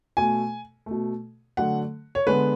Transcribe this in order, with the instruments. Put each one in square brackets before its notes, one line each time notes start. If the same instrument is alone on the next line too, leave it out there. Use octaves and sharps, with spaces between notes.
[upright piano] B2 A3 G#5
B2 A3
D3 F#3 A3 F#5
C#5
D3 G#3 B3 B4